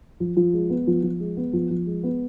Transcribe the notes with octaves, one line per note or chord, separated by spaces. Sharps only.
F3
F3
G#3
B3
F3
F3
G#3
B3
F3
F3
G#3
B3